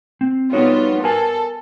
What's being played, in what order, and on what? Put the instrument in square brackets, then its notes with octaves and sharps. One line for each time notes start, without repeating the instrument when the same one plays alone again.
[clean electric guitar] C4
[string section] G3 B3 F4 [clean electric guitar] D#4 F#4 C#5
[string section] A4 [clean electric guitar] A#4 G#5